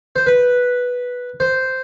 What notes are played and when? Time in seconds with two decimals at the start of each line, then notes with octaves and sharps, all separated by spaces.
0.16 C5
0.27 B4
1.40 C5